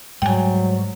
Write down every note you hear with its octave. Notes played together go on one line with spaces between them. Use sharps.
G#2 F#3 G3 G5 G#5